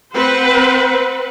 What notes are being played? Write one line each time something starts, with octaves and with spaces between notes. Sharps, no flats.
C4 B4 C5 F#5